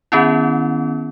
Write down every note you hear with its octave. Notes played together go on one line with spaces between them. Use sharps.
D#3 B3 C#4 E4